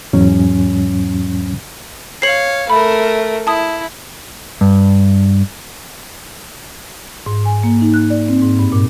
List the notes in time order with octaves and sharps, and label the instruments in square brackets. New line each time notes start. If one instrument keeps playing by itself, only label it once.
[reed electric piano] E2 G#2 F#3 C#4
[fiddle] C#5 F5 [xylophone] C7 F#7
[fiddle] A3 A#4 [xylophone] B5
[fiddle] E4 [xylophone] A5 D#6
[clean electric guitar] G2
[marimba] G#2
G#5
A#3
D#4
F#6
D5
C4
G#2
G2
A#2